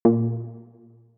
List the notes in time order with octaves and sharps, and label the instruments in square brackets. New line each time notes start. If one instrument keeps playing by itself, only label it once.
[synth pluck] A#2